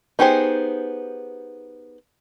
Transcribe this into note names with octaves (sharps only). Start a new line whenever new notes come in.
B3 D#4 G4 G#4 C5